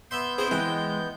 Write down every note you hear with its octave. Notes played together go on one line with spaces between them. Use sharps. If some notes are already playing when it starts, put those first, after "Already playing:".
B3 E5 C6 G6
C4 E4 G#4 C5
E3 G#3 G5